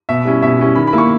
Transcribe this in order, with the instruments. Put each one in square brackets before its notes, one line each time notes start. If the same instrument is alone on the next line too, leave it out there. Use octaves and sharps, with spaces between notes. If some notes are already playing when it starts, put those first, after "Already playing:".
[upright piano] B2 E5
G3 C#4 E4
B2 E5
G3 C#4 E4
D#3 B5
B5
A#3 E4
C#6